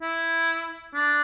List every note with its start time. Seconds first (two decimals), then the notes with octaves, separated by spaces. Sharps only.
0.02 E4
0.94 D4